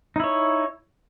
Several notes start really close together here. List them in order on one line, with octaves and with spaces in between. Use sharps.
D#4 E4 C#5